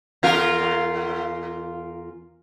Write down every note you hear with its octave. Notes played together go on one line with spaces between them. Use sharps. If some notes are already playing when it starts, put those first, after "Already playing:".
E2 F4 A#4